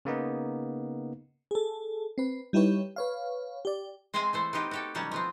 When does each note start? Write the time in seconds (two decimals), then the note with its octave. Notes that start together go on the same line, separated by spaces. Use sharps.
0.05 C#3 A#3 B3 D#4
1.51 G#4 A4
2.18 C4 B4
2.53 G3 D#4 E4 G4 B4 C#5
2.96 B4 C#5 F5
3.65 G4 D5
4.14 G#3 C4 C5 E5 F5 G#5
4.33 E3 A3 C5
4.53 B3 C4 D#4 G4
4.71 F#4 G4 A4
4.95 B2 D#3 F#3 G3 C#4 A5
5.11 F3 B3 C4